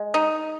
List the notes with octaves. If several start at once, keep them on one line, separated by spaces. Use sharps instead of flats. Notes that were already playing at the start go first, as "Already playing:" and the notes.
Already playing: G#3
D#4